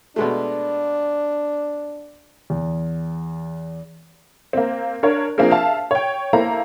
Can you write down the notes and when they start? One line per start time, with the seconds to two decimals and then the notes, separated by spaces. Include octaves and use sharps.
0.16 B2 G#3 A3 D4
2.50 E2
4.53 A#3 C4
5.03 D4 A#4 C#5
5.38 F3 A#3 C4 D4 G#4 A#4
5.51 E5 F5 A5
5.91 C#5 G5
6.33 A#3 E4 A4 C5 A#5